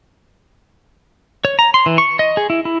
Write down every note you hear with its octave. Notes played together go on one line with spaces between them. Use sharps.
C#5
A#5
C6
E3
C#6
D#5
G#4
E4
E4